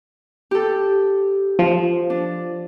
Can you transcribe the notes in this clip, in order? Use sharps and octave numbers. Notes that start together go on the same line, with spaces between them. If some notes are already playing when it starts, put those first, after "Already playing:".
G4 A4
F3
D4